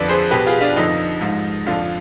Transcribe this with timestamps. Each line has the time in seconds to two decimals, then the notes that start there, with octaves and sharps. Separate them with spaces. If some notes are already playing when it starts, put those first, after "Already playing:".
Already playing: F2 D3 F3 B4 D5
0.08 G#4 C5
0.31 B2 G4 B4
0.47 F4 G#4
0.61 D4 F4
0.76 F2 D3 F3 D#4
1.21 G#2 F3
1.66 F2 D3 F3 D4 F4